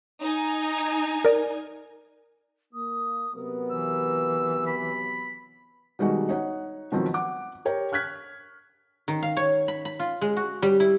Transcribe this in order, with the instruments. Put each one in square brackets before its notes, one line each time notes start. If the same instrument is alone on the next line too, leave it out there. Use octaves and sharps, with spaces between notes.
[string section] D#4 G#5
[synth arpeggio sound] A#4 D5
[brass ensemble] A#3 [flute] D#6
[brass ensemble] C3 F#3 B3 [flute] A#4
[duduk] E3 [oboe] E6
[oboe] B5
[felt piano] B2 D#3 G3 G#3 D#4 F#4
D#4 C#5 F#5
B2 D#3 F3 F#3 C4
F#5 D6
G4 A#4 C#5 G5
C#6 F6 F#6 G#6 B6
[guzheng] D#3
F5
C#5
B5
B5
F4
G#3
F#4
G3
E4